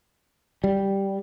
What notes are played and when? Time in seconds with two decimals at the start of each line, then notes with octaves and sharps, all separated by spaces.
0.64 G3